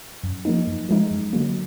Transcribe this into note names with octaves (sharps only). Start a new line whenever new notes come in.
F#2
F3 A#3 D#4
F#2
F3 G#3 D#4
F#2
D3 F#3 A#3